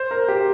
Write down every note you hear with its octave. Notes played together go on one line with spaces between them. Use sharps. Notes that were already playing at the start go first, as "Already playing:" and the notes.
Already playing: C5
A#4
G4